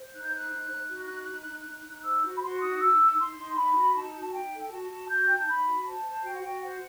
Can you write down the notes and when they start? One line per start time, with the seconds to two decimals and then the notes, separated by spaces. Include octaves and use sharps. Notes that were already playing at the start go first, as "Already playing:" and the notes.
Already playing: C5
0.13 D#4 F#6
0.23 G6
0.32 C5 F#6
0.50 D#4
0.70 D#4
0.88 F#4
1.09 D#4
1.28 D#4
1.47 D#4
1.65 D#4
1.85 D#4
2.03 C5 E6
2.23 F#4
2.36 B5
2.42 F#4 C6
2.60 D#4 D#6
2.80 D#4 E6
2.99 D#4
3.19 D#4 C6
3.36 D#4
3.56 D#4 B5
3.76 F#4
3.94 D#4 A5
4.13 F#4
4.22 A5
4.32 D#4 G5
4.52 A4
4.61 G5
4.71 F#4 A5
4.89 F#4
5.08 F#4 G6
5.26 D#4 G5
5.36 A5
5.47 D#4 B5
5.66 F#4
5.85 C5 A5
6.05 C5
6.23 F#4 G5
6.32 F#5
6.41 F#4 G5
6.61 C5 F#5